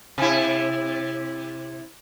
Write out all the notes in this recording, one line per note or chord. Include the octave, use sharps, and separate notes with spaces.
C3 E4